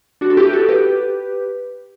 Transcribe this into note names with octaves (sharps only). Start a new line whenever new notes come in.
D4 F#4
A4
E4 G4
B4
F#4 A4
G4 B4